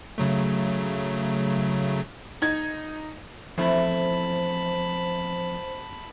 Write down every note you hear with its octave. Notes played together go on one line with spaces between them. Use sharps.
C#3 F#3 A3
D#4 G#6
E2 F3 A3 C4 E4 C5 A5 B5